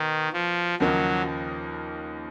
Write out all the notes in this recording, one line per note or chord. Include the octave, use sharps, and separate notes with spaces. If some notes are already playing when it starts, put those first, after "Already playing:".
Already playing: B2 D#3
F3
D#2 C#3 F3 F#3 A#3 D#4